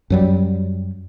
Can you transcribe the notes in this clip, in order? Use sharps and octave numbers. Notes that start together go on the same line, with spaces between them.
F#2 F#3 G3